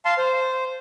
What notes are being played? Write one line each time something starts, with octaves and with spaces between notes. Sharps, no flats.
F5 A5 C6
C5